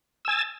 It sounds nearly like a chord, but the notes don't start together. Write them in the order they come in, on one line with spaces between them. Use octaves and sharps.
E6 G#5 A6